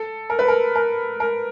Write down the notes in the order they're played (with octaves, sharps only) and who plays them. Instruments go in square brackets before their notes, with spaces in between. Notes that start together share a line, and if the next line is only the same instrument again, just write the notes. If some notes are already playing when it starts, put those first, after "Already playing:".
Already playing: [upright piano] A4
A#4
B4
A#4
A#4
A#4